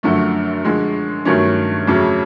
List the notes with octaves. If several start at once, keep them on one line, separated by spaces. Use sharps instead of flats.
F#2 D3 F3 A3
D3 F3 G#3
G2 D#3 F#3 A3 C#4
F2 C#3 F#3 A3